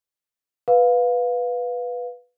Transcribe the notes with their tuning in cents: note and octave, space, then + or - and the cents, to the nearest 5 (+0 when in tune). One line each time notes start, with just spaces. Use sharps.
B4 +0 F5 +15